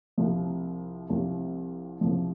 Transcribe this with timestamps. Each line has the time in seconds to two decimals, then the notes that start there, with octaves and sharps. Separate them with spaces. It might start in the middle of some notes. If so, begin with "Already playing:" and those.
0.18 C2 C3 F3
1.09 C2 C3 F3
2.01 C2 C3 F3